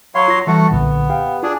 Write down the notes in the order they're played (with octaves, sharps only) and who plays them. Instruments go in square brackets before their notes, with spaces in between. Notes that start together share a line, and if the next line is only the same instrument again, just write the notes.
[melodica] F#3 C#5 C6 [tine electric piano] F5 B5
[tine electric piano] F4 A#6
[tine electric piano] E3 G3 [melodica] A3 F#4 A4
[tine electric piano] B1 A#2 D3 [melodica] B3
[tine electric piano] G4 F5 G5
[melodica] D4 G#4 [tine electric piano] F4